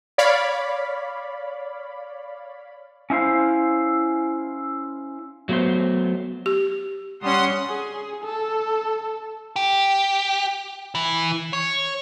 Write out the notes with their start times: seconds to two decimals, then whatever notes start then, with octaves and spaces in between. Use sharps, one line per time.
0.18 C#5 D5 F5 B5
3.10 C#4 E4 C5 F5
5.49 F#3 A3 B3 A4 C5
6.46 G4
7.23 G3 C#4 F#5 C6 D#6
7.69 G#4
8.24 A4
9.56 G4
10.95 E3
11.53 C#5